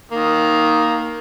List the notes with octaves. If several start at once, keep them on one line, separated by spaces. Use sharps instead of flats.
D#3 A#3